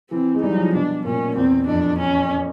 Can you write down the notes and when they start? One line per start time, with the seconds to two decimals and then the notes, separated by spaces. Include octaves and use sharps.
0.10 E3 C4
0.35 G#3
0.42 G3 D#4
0.51 F#3
0.58 F3
0.74 B2 D4
1.05 A#2 C#4
1.36 E2 C4
1.67 F2 D4
1.99 C#4